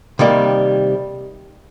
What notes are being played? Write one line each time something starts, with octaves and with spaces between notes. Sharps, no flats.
C3 D#3 G3 A#3